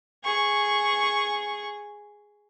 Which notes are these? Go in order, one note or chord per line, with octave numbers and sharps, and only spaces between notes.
G#4 C#6